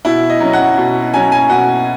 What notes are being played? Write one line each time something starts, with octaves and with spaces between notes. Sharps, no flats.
B2 E4
D#5
F#3 C#4
F#5
B2
F#3 C#4 G#5
G#5
B2 F#5